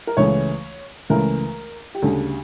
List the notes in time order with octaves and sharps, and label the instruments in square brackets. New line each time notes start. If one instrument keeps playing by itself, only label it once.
[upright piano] A#4
C#2 C#3 E3 A3 C#5
C#2 C#3 E3 A3 A#4
G4
D2 C#3 G3 A4